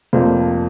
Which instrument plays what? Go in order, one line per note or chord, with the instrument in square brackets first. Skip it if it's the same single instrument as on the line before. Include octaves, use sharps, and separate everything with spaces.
[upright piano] F1 F2 C3 F3 A#3 C5